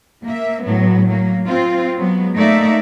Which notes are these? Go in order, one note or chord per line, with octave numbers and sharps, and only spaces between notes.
A#3 E5
A2 F#3 B3
F#3 A#3
C4 F4
F#3 G#3 B3
A3 A#3 D#4 D5 E5